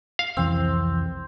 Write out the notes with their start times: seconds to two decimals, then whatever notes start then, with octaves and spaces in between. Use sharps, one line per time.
0.19 F5
0.37 C2 F2 E3 C4